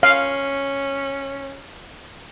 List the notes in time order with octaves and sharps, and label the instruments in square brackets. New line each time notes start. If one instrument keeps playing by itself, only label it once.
[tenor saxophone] C#4 [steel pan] F5